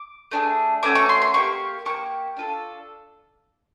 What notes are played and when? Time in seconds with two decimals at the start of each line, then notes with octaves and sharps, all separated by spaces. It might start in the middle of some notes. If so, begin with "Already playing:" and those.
Already playing: D6
0.31 A3 D4 F4 G#4
0.83 A3 C#4 F#4 D6
0.95 C#6
1.09 C6
1.22 C6
1.34 A#3 D4 G4 C#6
1.86 A#3 D4 G4 C#6
2.37 D4 F4 A4